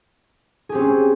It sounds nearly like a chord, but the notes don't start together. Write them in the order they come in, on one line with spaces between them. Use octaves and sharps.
G#4 G4 C4 C#4